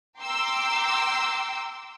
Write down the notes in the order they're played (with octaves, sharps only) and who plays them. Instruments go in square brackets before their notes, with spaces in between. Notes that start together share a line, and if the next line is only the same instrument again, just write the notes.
[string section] G5 A#5 C6 D6 E6